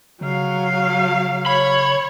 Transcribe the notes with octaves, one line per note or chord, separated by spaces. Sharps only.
C#3 F#3 F5
C#5 B5